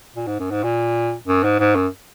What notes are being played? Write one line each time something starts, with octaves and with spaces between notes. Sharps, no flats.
A#2
G#2
F#2
G#2
A#2
F#2
G#2
G#2
F#2